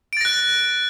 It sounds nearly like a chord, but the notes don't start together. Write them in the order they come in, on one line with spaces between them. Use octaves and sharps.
D7 A6 A#6 F#6